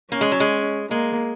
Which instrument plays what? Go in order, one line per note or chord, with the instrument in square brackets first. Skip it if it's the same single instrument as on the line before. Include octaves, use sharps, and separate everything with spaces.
[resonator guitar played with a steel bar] A#3 [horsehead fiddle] C#4
[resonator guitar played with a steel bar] G#3
F#3
G#3
[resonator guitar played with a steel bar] G#3 [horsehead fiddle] A#3